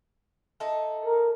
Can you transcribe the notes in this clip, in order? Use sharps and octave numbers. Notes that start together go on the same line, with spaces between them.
D#4 E4 A4
A#4